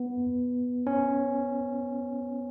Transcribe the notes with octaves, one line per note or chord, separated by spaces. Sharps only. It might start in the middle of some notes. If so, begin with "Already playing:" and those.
Already playing: B3
C#4